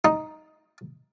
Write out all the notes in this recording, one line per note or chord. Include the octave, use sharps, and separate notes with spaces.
D#4